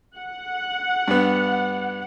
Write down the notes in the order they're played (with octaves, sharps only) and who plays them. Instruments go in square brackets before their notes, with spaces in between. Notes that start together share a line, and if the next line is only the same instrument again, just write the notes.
[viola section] F#5
[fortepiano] G2 B3